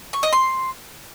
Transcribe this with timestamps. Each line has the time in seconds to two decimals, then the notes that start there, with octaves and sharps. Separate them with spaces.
0.13 C#6
0.23 D#5
0.33 C6